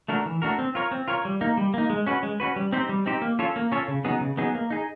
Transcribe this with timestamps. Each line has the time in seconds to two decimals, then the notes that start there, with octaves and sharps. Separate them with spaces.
0.08 A3 D4 F#4 A#4
0.26 E3
0.42 A3 D4 F#4 A#4
0.59 C4
0.75 F4 A#4 C#5
0.91 C4
1.08 F4 A#4 C#5
1.25 G3
1.41 A#3 D#4
1.57 G3
1.74 A#3 D#4
1.90 G#3
2.07 C#4 F#4 B4
2.23 G#3
2.40 C#4 F#4 B4
2.56 G3
2.73 C4 D#4 G4 C5
2.89 G3
3.06 C4 D#4 G4 C5
3.22 A#3
3.39 C#4 F4 A4 C#5
3.56 A#3
3.72 C#4 F4 A4 C#5
3.88 C#3
4.05 F#3 B3 D#4 G#4
4.21 C#3
4.37 F#3 B3 D#4 G#4
4.55 A#3
4.70 D#4 G#4